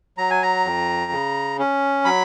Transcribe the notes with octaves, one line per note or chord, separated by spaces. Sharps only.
F#3 A#5
G#5
A#5
F2
C#3
C#4
F#3 B5